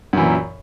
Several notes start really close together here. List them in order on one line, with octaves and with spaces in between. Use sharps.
F#2 E3 A#2